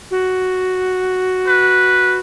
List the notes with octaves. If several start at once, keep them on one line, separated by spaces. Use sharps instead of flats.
F#4
B4